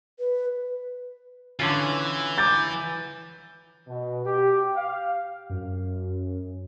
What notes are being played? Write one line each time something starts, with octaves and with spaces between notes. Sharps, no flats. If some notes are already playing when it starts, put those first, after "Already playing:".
B4
D3 E3 C#4 F4
D6 G6 A6
B2
G4
F5
F#2